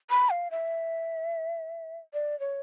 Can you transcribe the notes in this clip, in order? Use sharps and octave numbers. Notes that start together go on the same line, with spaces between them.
B5
F5
E5
D5
C#5